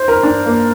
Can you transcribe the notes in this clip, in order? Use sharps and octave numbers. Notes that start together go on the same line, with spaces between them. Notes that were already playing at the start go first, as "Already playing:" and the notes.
Already playing: C5
A#4
D4
A#3